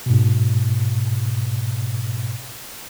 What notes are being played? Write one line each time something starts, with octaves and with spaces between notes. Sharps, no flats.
G#2 B2